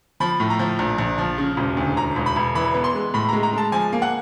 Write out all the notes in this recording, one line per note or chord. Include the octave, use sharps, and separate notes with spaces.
F3 B5
A2
A#5
F3
A#1
A#1
F3
C#3
E1
D2
E1 A#5
E1
B5
E1
E3 B5
B3
C6
G#3
A2 B5
G#3 A#5
A#5
G#3 A5
F3 G#5
A#3
F#5